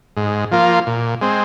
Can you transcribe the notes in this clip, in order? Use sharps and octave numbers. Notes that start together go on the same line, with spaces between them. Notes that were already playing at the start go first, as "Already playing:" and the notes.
G#2
F3 A#3 F4
A#2
G#3 C4